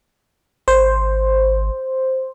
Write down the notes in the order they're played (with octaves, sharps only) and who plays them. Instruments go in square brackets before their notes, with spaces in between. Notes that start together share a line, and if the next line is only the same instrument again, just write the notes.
[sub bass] G#1 [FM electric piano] C5